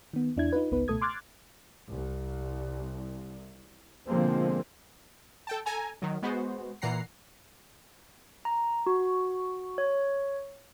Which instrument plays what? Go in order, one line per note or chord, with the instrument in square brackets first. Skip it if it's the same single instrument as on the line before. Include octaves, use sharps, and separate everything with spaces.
[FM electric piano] D#3 B3
E2 D4 E4 G#6
D#4 F4 B4
G#1 C#2 B3 D#4 B4
C#2 B2 A3 A4 D#6 G#6
C6 D6 F6 F#6 G#6 A6
[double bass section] C2
B2 D3 F3 G#3 A#3 C4
[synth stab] A4 G5 A5
A4 G#5 A#5
D#3 F#3
G#3 B3 F#4 C5
A#2 E3 F#5 A#5 C7
[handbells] A#5
F#4
C#5